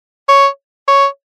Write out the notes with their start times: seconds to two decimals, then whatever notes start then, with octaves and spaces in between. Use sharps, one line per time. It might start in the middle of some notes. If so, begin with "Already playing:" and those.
0.29 C#5
0.88 C#5